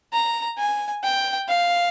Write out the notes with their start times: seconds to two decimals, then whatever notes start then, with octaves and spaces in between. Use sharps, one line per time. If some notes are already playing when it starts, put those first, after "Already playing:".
0.13 A#5
0.59 G#5
1.04 G5
1.49 F5